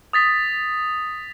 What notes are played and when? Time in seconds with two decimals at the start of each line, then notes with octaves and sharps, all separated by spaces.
0.13 D#6 A6 B6